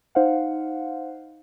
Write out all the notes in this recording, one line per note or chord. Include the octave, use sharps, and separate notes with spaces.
D#4 C5 F5 F#5